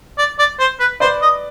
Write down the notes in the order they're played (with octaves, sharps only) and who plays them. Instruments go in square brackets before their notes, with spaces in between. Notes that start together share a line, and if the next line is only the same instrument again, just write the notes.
[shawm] D5
D5
C5
B4
[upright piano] B4 D5 [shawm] C5
[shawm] D#5